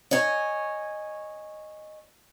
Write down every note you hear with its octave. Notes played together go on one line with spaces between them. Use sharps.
C#5 D#5 G#5